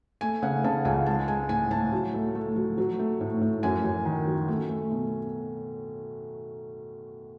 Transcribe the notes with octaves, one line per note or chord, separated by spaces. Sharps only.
A3 G#5
C#3 F#5
C#3 A5
C#2 G#5
G#3 A5
G#3 G#5
A2 G#5
A2 A5
F#3
A3
A3
F#3
F#3
A3
A2
A2
F#2 G#5
F#2
D#3
F#3
A3
A3
B2